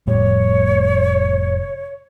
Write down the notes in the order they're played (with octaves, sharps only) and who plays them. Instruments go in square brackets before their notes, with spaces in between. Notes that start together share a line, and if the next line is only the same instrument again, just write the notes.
[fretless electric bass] F1 A2 G3 [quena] C#5